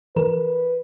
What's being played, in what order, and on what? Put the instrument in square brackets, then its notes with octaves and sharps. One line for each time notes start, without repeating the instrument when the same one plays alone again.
[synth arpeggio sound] E3 A#4 [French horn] B4